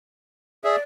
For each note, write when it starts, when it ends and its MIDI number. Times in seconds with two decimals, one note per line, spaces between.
0.64 0.76 68
0.64 0.80 74
0.64 0.76 76